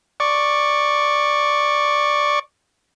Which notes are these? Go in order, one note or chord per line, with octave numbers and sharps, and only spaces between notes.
D5 C#6